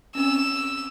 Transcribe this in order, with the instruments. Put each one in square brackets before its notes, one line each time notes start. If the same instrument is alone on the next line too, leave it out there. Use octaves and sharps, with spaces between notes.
[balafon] C4 C#4 [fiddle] E6